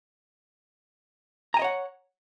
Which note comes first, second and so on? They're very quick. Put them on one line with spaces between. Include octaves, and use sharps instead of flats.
A#5 G#5 D#5 C#5 F#5